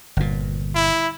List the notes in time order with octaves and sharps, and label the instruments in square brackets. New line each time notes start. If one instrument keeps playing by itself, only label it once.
[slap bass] G1 A#2
[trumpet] E4